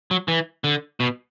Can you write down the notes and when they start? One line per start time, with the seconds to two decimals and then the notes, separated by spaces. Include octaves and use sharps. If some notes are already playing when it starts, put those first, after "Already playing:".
0.11 F#3
0.28 E3
0.64 D3
1.00 B2